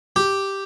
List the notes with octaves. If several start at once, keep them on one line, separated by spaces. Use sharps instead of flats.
G4